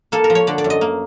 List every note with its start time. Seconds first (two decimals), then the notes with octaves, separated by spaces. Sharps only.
0.12 A#3 A4
0.24 A#4
0.30 F3
0.35 C#5
0.47 D3 D5
0.58 D5
0.64 F#2
0.70 D#5
0.81 A#3